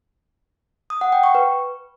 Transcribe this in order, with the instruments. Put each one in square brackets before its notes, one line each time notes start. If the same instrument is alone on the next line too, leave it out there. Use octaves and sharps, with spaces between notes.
[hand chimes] D#6
F#5
G5
C#6
B4